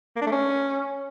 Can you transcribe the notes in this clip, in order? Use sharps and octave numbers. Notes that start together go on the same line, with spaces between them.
A#3
D4
A3
C#4